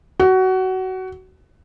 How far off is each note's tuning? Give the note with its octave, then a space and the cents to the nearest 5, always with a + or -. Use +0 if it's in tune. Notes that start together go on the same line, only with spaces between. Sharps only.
F#4 +20